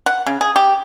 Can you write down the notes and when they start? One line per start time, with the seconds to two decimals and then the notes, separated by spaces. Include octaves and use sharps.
0.06 F#5
0.26 C#3
0.41 G#4
0.56 G4